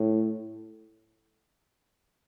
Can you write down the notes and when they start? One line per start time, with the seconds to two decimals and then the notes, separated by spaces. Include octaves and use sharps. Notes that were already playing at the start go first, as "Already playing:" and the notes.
Already playing: A2